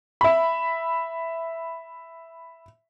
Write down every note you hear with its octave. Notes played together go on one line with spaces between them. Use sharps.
E5 B5